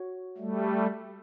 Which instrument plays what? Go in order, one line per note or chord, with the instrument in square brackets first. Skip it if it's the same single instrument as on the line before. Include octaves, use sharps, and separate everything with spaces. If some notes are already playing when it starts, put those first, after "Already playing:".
Already playing: [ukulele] F#4 C#5
[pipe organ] G3 A3